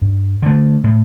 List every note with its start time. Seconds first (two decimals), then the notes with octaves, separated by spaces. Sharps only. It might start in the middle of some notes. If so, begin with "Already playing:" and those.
0.02 G2
0.42 D3 A3
0.84 A2